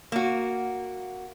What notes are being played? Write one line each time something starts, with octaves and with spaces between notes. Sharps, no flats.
A#3 F#4